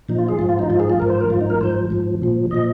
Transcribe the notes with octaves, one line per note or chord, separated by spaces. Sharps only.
A#2 F3 D#4
F4
G#4
G#2 F3 F4
F4
D#4
G#2 F3 F4
G#4
F4
G#2 F3 A#4
C5
A#4
G#2 F3 F4
D#4
A#4
G#2 F3 C5
G#2 F3
A#2 F3
A#2 F3 D#5